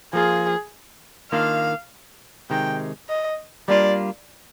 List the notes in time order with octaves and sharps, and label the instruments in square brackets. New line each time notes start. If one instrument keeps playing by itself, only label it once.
[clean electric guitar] F3 A#3 F4 [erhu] G#4
[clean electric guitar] D#3 A#3 D4 F4 [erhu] F5
[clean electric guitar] C3 D#3 G#3 D#4 [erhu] G5
[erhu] D#5
[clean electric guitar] G3 A#3 D4 F4 [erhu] D5